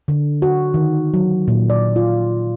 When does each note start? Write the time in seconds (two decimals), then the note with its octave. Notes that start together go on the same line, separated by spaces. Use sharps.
0.08 D3
0.42 F#4
0.74 D#3
1.14 F#3
1.48 A#2
1.70 D5
1.96 F4